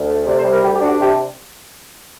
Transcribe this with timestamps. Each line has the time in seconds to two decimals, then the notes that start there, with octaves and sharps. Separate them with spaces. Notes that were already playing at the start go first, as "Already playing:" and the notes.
Already playing: D2
0.08 A3
0.26 C3 D5
0.38 C5
0.44 G3
0.51 A#4
0.63 D2 G4
0.75 G4
0.81 D4 F#4
0.87 G4
1.00 C3 G4